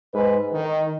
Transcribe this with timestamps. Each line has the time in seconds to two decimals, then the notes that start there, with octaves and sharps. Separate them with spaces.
0.13 G#2 G#3 G#4 B4
0.53 D#3